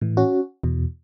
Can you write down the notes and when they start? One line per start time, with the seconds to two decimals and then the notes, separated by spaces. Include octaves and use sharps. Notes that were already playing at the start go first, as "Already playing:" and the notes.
0.01 A2 E3
0.17 C#4 F#4
0.63 E2 B2